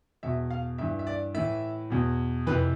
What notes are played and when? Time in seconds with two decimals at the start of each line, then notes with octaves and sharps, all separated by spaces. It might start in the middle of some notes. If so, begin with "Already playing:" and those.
0.23 E2 B2 E5
0.50 F5
0.78 G2 E3 E5
0.99 E5
1.07 D5
1.35 A2 E3 E5
1.90 E2 B2
2.47 F2 C3 E3 B4